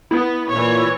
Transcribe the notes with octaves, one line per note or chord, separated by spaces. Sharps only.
B3 E4
A#2 E3 C#5